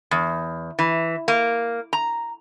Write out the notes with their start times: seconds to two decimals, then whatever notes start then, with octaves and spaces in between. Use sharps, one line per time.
0.11 E2
0.79 E3
1.28 A#3
1.93 A#5